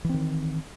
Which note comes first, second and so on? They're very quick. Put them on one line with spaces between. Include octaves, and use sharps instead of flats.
E3 C4 D#3